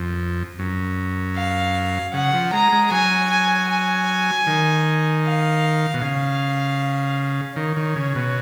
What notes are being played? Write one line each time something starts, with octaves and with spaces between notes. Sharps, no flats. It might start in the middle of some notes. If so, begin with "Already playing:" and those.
Already playing: F2
F#2
F5
C#3 F#5
F3
G#3 A#5
G#3
F#3 G#5
G#5
G#5
D#3
F5
B2
C#3 F5
D#3 C#5
D#3
C#3
B2